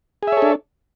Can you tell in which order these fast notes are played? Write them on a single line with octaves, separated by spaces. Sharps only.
G#4 E5 C#5 A4 D4